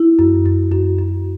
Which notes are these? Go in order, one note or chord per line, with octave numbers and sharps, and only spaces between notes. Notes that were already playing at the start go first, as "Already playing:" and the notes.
Already playing: E4
F#2
F#2
F#2
F#2